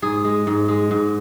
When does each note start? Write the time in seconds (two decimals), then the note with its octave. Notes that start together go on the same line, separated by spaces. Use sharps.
0.02 G#2 G#4
0.25 G#3
0.47 G#2
0.69 G#3
0.91 G#2